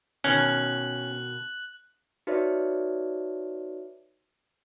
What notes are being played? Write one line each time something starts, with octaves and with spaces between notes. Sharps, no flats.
B2 D#3 C#4 F#6 F#7
D#4 F#4 B4 C#5 D5 E5